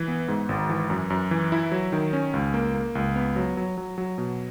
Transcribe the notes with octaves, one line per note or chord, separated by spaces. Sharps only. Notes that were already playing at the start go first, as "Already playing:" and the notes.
Already playing: E3
B3
G#2
G#1
E3
F#2
F#2
E3
E4
F#3
D#3
C#4
C#2
A#3
A#3
C#2
B3
F#3
F#3
F#3
F#3
B2